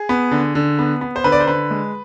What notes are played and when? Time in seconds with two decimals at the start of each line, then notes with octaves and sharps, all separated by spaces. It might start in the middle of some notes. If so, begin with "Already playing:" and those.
Already playing: G#4
0.09 B3
0.31 D3
0.55 D3
0.79 B3
1.01 B3
1.16 C5
1.24 D3 B4
1.32 D5
1.40 C5
1.47 D3 B4
1.71 G#3